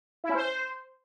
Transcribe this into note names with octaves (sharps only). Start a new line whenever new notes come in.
E4
C#4
C5